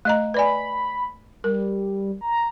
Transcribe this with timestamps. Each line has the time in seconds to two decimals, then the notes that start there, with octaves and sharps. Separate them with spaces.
0.05 A3 D#5 A#5
0.34 B4 D5 G#5 B5
1.44 G3 A#4
2.21 A#5